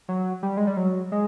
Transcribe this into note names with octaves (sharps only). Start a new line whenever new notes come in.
F#3
G3
G#3
G3
F#3
G#3